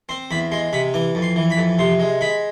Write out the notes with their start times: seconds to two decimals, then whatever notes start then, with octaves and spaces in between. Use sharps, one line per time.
0.09 C4 C6
0.31 E2 B5
0.52 G#3 C6
0.73 C3 B5
0.94 E3 D6
1.15 F2
1.22 C6
1.36 E3
1.50 B5
1.57 F2
1.79 C3 C6
2.00 G#3
2.21 G#3 B5